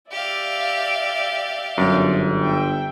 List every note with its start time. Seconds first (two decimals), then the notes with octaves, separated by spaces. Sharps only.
0.11 G4 D5 E5 F5
1.78 G1 F#2
2.42 E5 G5